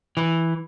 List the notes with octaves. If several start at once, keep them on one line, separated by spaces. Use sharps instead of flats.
E3